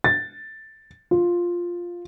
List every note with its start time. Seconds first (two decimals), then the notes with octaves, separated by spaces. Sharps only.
0.04 A6
1.11 F4